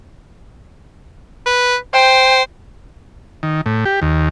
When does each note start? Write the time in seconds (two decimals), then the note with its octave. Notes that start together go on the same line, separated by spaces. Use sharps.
1.46 B4
1.94 C5 G5
3.43 D#3
3.66 A2
3.85 G4
4.02 D#2